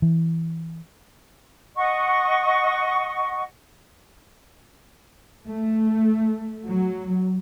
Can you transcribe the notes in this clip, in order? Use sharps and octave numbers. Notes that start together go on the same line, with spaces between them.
E3
D#5 F#5 C#6
A3
F#3